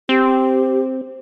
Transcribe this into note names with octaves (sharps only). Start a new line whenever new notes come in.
C4 G4